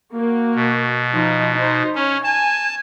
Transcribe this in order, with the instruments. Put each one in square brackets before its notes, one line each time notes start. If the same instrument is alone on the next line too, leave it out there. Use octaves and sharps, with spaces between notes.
[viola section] A#3 F#4
[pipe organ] B2
[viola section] F3 D#4
D#4 C5
[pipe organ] C#4 [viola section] C#5
[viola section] G#5 [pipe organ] A5